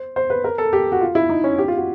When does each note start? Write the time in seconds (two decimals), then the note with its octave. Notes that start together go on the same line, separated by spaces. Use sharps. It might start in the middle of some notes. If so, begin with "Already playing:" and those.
Already playing: C5
0.16 C5
0.30 B4
0.44 A#4
0.58 A4
0.73 G4
0.92 F#4
1.01 F4
1.15 E4
1.30 D#4
1.44 C#4
1.58 G4
1.68 F4
1.77 F#4